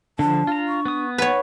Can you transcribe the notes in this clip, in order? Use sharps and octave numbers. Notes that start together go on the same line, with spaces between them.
D3 F3 D4 A5
F4 A#5
C#6
B3 D#6
B4 C#5 F#5